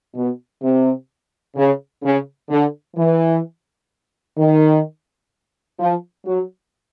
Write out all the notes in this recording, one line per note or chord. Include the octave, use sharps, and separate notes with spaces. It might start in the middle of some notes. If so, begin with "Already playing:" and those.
B2
C3
C#3
C#3
D3
E3
D#3
F3
F#3